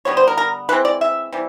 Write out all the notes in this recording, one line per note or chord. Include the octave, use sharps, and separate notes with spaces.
D3 G3 B3 C#5
C5
A#4
A#4
E3 G#3 C4 B4
D5
E5
C3 E3 G3